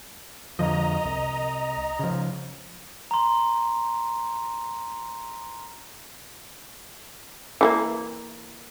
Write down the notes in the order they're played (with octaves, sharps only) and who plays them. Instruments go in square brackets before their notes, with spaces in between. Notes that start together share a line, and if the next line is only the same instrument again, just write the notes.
[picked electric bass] F2 D3 F3 [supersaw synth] D#5 A#5
[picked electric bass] C2
C#3 F3
[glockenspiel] A#5 C6
[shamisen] E3 A3 A#3